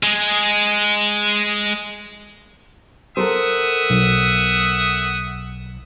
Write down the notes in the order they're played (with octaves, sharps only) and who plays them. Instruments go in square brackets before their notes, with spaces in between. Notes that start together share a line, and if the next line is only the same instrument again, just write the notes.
[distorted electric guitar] G#3 G#4
[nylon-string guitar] A4 A#4 C5 [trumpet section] E5 F#5 D#6
[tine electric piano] B1